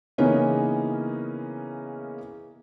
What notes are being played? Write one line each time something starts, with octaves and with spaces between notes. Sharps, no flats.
C#3 E3 A#3 B3 C#4 D#4